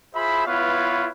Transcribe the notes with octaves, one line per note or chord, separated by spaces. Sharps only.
F4 G#4 C5 E5 B5
B3 E4 F4 B4 C#5 F5